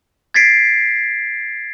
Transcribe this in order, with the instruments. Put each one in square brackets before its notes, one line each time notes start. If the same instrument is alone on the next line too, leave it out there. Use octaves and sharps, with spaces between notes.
[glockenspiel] G#6 A6 B6 C7 D7